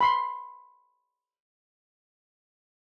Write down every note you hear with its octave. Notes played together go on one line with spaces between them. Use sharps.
B5 C6